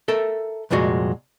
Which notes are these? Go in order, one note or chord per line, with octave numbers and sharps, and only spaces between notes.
A4 A#4 E5
C2 F2 A#2 G#3 F#4